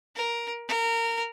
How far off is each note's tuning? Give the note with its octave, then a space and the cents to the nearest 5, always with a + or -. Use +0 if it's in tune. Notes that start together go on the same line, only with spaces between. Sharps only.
A#4 +10
A#4 -20